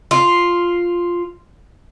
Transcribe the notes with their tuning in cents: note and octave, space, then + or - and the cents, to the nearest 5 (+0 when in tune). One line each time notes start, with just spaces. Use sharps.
F4 +0